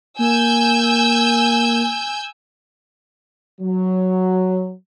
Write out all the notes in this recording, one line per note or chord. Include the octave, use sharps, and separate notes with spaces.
A#3 G#5 E6 G6
F#3